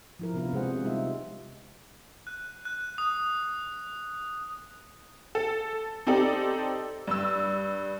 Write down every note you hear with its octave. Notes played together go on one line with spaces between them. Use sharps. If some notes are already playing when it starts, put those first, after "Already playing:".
F3 E4 A#4
C3 F3 B3 D4 F4 A#4
C3 G#3 G#4 C5 F#5
G3 G#3 D#4 F4 E5
F#6
F#6
D#6
A4
C4 D#4 G4 A4 D5
G2 E6